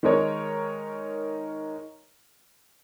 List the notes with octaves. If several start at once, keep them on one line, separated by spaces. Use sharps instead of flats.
D#3 G#3 D#4 A#4 C#5